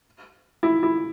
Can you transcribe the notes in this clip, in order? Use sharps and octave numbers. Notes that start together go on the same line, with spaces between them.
E4
E4